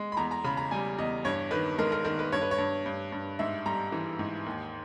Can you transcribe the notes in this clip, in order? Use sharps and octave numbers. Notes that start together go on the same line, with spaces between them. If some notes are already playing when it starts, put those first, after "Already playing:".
Already playing: G#3
B5
E2 A#5
A#5
C#3 B5
A#5
G3 G#5
E2 D#5
G2 C#5
D#3 B4
G#3 A#4
A#4
D#3 A#4
B4
G2 C#5
B4
C#5
G2
G2
G2
G#2 E5
G3 A#5
E3
G#2
D#2